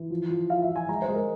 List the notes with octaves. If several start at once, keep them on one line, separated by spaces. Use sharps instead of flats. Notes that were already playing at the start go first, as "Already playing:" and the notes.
Already playing: E3
F3
F3
F3 F5
E5
F3
G#5
G#3 A#5
C5
G#3
A#4